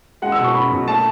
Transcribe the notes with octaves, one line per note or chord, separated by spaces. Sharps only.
G#3 F#5
E6
B2
C#6
C#4 B5
B1
A3 A5